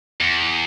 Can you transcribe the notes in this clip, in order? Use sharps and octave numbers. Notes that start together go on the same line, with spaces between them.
E2